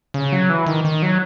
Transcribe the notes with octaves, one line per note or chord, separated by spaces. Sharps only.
C#3
F#3
E3
D#3
D#3
F#3